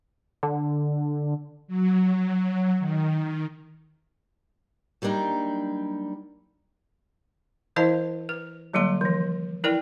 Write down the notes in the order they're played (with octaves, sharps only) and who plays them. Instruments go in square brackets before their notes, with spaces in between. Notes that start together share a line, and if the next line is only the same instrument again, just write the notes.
[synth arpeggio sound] D3
[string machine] F#3
D#3
[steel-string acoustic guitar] F#3 G3 A#3 D4 D#4
[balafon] E3 E4 C5 D#5 F5 A5
B4
D3 F#3 G3 A#3 C6
E3 F3
E4 A#4 B4 D5 G5